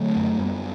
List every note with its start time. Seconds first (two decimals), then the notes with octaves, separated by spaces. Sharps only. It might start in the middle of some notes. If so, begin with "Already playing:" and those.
Already playing: D3 F#3 A3
0.17 F#2
0.39 F#2 G3 B3